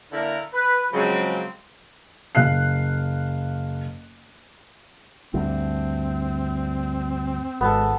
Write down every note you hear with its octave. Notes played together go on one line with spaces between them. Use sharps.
D3 A#3 D4 E4 A#4
B4
C#3 F3 F#3 G#3 C4
F#1 F5 F#6 C7
D2 G2 C4
G#1 G#3 B3 A4